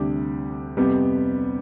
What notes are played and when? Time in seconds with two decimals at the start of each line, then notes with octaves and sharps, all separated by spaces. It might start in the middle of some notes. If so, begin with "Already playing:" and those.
Already playing: D2 C3 G3 D4 G4
0.77 F2 C3 G3 B3